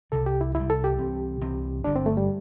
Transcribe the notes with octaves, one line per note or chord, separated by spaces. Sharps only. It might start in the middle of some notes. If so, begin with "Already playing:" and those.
C2 C3 G3 A4
G4
E4
C2 C3 G3 E4
A4
G4
C2 C3 E3 C4
C2 C3 E3 C4
G1 G2 D3 D4
C4
A3
G3